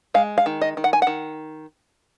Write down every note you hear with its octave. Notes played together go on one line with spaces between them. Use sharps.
G#3 F5
F5
D#3
D#5
D#3
F#5
G#5
D#3 F#5